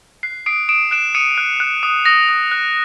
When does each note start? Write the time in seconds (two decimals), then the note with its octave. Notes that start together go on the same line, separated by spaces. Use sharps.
0.23 F#6 C7
0.46 D#6 C7 D7
0.69 D#6 D7 E7
0.91 F#6 D7 E7
1.15 D#6 C#7 D#7
1.38 F#6
1.60 F#6
1.83 D#6
2.06 D#6 A#6
2.29 D#6
2.51 F#6